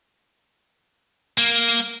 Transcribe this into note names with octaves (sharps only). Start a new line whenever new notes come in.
A#3